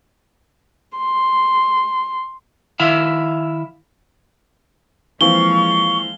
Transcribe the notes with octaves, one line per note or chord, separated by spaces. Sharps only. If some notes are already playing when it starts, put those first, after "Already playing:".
C6
D#3 E4 E5 F5
E3 F3 G#3 A#3 C4 F5 C#6 G7